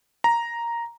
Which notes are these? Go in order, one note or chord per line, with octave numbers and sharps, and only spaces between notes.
A#5